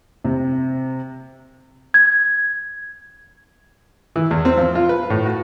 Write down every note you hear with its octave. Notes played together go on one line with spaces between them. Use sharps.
C3
G#6
E3
E2
C4
F3
F4
B4
A2
F#4